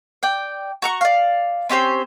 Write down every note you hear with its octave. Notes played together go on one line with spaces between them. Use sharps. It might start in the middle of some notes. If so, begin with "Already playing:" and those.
D5 G5
F#4 A#5 C#6
D5 F5
C4 C#4 G4 C5